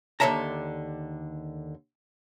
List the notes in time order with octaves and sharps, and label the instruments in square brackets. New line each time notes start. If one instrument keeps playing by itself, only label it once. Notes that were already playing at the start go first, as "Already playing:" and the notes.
[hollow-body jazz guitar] D#2 D3 C#5 E5 A5 A#5